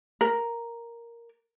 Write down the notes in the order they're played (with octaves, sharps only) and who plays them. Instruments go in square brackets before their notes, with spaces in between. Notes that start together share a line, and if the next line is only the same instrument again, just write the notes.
[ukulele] A#4